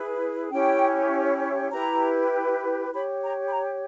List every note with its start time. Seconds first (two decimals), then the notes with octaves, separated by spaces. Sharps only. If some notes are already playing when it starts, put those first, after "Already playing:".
Already playing: E4 G#4 B4
0.50 C#4 E4 G4 C#5 G5
1.72 E4 G4 B4 A#5
2.92 G4 C#5 B5
3.22 A#5
3.48 B5
3.53 A#5